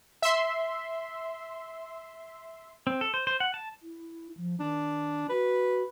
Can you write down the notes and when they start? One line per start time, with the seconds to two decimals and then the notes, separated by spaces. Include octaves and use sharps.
0.22 E5 C6
2.87 C4
3.01 A4
3.14 C5
3.27 C5
3.40 F#5
3.54 A5
3.82 E4
4.37 F3
4.60 D#3 D4
5.29 F#4 B4